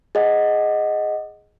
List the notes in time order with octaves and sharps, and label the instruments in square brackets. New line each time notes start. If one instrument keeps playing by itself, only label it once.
[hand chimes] G#4 D#5 F#5